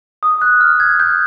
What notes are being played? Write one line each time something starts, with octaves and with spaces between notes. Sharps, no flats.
D#6
F#6
F6
G#6
G6